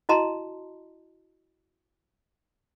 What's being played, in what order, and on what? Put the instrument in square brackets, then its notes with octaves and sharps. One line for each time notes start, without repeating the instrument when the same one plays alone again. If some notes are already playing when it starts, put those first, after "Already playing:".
[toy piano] E4 F#4 D#5 A5 A#5 C6